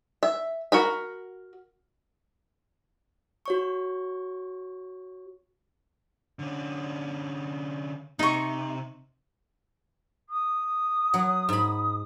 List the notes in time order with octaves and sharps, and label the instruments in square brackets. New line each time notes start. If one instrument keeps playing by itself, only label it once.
[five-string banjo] E5
F#4 A#4 B5
[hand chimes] F#4 C#5 C#6
[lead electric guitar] D3 C#4
[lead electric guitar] C3 [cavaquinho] D#4 C#6
[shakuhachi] D#6
[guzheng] F#3
G#2 B5